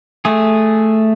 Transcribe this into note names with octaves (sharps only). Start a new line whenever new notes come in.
A3 G#4